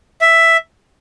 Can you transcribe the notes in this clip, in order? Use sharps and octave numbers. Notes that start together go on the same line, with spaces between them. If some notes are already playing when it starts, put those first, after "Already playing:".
E5